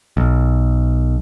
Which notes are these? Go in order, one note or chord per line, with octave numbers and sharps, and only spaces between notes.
B1